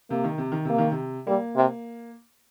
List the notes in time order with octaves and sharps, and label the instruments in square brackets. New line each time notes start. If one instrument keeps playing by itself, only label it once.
[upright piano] C3 [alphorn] A#3
[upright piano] D#3
C3
D#3
[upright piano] C3 [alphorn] A#3
[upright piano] D#3
C3
[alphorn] G3 [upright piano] A#3
[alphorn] C3